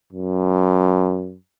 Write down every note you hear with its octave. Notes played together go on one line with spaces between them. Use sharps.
F#2